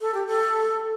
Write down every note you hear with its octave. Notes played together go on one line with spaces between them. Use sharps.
A4
G4
A4